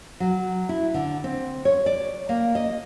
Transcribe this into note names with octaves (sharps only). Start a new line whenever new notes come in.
F#3
E4
D3
C4
C#5
D5
A#3
D#5